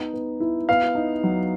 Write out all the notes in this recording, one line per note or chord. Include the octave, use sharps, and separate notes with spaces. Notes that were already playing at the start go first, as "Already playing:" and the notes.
Already playing: B3 D#4
B3
E4
B3 F5
D#4
F#3